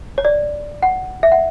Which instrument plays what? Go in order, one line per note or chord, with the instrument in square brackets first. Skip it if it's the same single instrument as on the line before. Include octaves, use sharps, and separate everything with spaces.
[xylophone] C#5
D5
F#5
E5
F#5